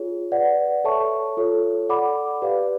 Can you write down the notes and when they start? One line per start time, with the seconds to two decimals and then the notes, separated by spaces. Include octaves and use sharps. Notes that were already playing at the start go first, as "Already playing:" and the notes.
Already playing: F4 G#4 C#5
0.32 B4 D5 F#5
0.84 A4 C#5 E5 A5 C#6
1.37 F4 A4 C#5
1.89 A4 D5 F#5 B5 D6
2.42 G4 B4 D5 F5